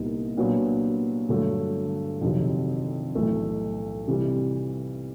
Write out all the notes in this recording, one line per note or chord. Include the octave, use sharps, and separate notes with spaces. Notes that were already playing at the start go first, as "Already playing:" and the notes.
Already playing: C2 A#2 G3 B3 D#4
A#2 F#3 B3 D4
G2 D3 F#3 A3
F2 C3 D#3 F#3
B1 A2 E3 A3
C3 E3 G3